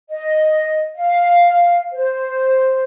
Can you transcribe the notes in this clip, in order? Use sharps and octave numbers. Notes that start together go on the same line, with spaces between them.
D#5
F5
C5